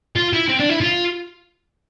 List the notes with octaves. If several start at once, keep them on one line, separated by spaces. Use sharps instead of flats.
F4
E4
C4
D4
E4
F4